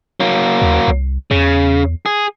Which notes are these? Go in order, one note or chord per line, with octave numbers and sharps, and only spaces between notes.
F#3 A#3
D#2
C2
E2 C#3
G#4